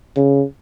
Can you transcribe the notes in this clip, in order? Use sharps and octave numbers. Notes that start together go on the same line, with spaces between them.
C#3